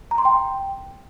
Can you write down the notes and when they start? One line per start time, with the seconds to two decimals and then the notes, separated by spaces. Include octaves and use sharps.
0.11 A#5
0.18 C6
0.25 G5